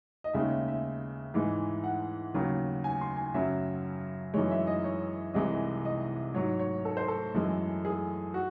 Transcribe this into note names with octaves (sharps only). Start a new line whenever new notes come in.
D#5
D#2 C#3 G#3 E5
E5
E5
G#2 E3 G#3
F#5
D#2 C#3 F#3
G#5
C6
G#5
F#2 C#3 F#3 E5
F#2 E3 G#3 C#5
E5
D#5
C#5
C2 C3 E3 G#3 D#5
D#5
G#2 F#3 C#5
C#5
A4
C5
A4
F#2 E3 G#3
G#4
F#4